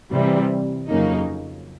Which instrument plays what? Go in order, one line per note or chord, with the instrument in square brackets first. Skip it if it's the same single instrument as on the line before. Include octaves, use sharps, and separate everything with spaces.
[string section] C3 E3 G3
F2 C#3 F#3 A#3 D#4